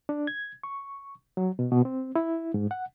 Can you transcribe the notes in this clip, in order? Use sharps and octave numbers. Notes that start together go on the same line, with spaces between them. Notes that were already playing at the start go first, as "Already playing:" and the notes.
D4
G#6
C#6
F#3
B2
B2
C4
E4
G#2
F#5